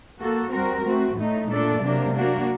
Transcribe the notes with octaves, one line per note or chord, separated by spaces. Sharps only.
A#3 F#4 A4
G3 C4 F#4 A#4
A3 C4 F#4
A2 A3 D#4
A#2 A3 D4 A4 D5
C3 F#3 A#3 D4
A#3 D4 F#4